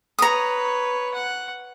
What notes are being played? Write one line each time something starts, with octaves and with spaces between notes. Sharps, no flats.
B4 C#5 A#5 D#6
F#5